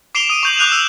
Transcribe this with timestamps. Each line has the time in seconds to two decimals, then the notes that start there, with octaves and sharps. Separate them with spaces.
0.15 D6 C7 D7 E7 F7 G7
0.30 D#6 D#7
0.43 C#6 G6 F#7
0.58 D6 D#6 F#6 G6 D#7 F7
0.72 E6 E7